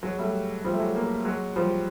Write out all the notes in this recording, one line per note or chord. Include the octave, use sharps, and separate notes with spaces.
F#3 G#3
G3 A3
F3 G3
A3
F#3 G#3
G#3 A#3
F#3 G#3
F3 G3